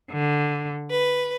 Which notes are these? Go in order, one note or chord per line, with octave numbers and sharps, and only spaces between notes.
D3
B4